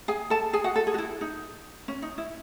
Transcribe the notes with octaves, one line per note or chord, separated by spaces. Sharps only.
G#4 G#5
A4 A5
G#4 G#5
F#4 F#5
A4
G#4
F#4
E4
D#4
C#4
D#4
E4